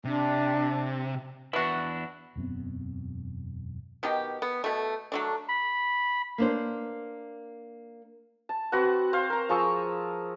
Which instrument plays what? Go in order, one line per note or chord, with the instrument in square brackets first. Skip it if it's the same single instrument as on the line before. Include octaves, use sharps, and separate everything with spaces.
[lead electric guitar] C3 [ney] D4
[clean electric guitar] E2 D4 E4 [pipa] B3 F#4
[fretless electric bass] E1 F#2 B3 C4
[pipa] B2 D#3 B3 G4
B3
B2 A3
F#3 A3 D4
[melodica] B5
[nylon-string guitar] A#3 D4 C5
[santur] A5
C4 F#4 B4 F#5
C5 F5
A#4 A#5
F3 G#4 C#6 E6